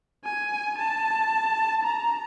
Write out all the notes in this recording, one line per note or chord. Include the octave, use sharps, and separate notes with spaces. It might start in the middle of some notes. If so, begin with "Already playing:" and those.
G#5
A5
A#5